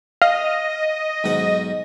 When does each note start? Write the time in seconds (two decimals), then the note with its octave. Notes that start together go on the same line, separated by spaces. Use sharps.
0.22 D#5 F5
1.24 B1 G#2 F#5